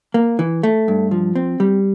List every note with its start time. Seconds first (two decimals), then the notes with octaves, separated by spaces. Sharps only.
0.14 A#3
0.39 E3
0.63 A3
0.88 G2
1.11 F3
1.35 C4
1.60 G3